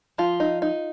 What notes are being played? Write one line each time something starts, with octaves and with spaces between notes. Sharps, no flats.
F3 F4
D#4
D#4